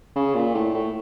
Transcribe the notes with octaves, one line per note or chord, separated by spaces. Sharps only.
C#3
A#2
A2
A2